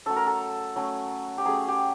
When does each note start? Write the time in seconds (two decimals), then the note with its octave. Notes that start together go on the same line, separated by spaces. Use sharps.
0.06 F#3 A3 C#4 A4
0.16 A#4
0.26 A4
0.76 F#3 A3 C#4
1.38 G4
1.45 F#3 A3 C#4 G#4
1.68 G4